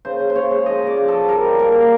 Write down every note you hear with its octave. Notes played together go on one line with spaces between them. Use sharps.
C#3 C5
C#3
C5
C#3 C#5
G#3
F3 D#5
C#3 D5
G#3
F3 A4
G3 A#4
G3
A#3 A#4
A#2